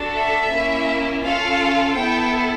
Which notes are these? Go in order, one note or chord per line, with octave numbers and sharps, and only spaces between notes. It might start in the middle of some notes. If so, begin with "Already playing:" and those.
Already playing: D4 F#4 A4
E5
A#3 C#4 E4
C#4 F4 A4 F5
B3 E4 A4 G5